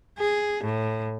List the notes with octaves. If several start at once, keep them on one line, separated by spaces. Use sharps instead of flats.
G#4
A2